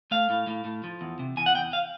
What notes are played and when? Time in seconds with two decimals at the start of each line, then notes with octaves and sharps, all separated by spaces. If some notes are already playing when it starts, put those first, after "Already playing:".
0.11 A3 F5
0.30 A2
0.47 A2
0.65 A2
0.84 F3
1.01 E2
1.19 C3
1.37 E2 G#5
1.46 F#5
1.55 E2 G5
1.73 F5